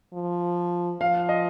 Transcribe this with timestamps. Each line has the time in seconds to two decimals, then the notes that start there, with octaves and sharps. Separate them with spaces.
0.13 F3
1.00 F3 F5
1.29 D#5